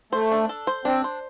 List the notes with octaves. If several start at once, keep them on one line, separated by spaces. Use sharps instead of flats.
A3 C5
D4
A4
C5
C4 D4
C5